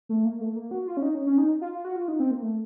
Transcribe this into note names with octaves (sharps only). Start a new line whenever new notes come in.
A3
A#3
A3
A#3
F#4
F4
C#4
D#4
C#4
C#4
D#4
F4
F4
F#4
F4
D#4
C4
A#3
A3